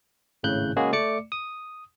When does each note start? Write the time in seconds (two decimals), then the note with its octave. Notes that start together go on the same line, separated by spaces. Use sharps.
0.43 G#1 A2 C#3 F#6 G6
0.76 C#3 G#3 A#3 F#4 G#4
0.92 A3 D5 D6 C#7
1.32 D#6